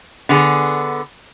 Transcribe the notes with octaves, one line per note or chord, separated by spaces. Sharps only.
D3 B3 G#4